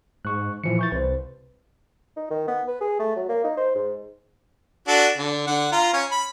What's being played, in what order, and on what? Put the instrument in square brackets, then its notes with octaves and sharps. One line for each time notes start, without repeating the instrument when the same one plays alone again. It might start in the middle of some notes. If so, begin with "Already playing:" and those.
[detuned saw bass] G#2 [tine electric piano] C#6 F#6
[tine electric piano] A#2 F3 C#7 [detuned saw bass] E3
[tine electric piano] C#6 G6 A6
[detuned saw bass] C2 [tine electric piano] B4 C5
[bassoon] D#4
D#3
B3
B4
G#4
A3
F#3
A#3
D#4
C5
G#2
[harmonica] D4 F#4 A4
D3
D3 F#5
F4 A#5
C#4 C#5
B5